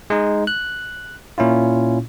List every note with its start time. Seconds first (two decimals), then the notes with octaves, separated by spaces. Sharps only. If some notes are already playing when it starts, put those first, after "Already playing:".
0.10 G#3 D#4
0.47 F#6
1.38 A#2 C#4 E4 F4